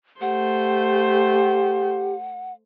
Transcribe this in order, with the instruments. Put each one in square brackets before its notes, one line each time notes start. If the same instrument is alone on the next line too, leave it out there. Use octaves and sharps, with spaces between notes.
[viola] A3 C5 [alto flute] G4 [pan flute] F#5